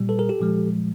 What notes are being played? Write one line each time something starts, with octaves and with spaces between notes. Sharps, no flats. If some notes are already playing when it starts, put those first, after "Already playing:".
Already playing: A#2 G3
A4 B4
G#4 A#4
G4 A4
A#2 F3 G#3